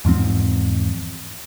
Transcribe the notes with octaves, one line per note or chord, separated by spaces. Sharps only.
E2 G#2 F3 C4